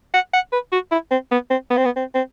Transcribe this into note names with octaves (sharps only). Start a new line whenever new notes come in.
F#5
F#5
B4
F#4
E4
C4
B3
C4
B3
C4
B3
C4
C4